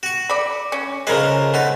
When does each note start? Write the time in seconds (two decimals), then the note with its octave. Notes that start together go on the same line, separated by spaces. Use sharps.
0.03 F#4 C#6
0.30 D5 B5
0.72 C#4
1.07 C#3 F3 G#3 A#4 B4
1.54 A3 B3 D#4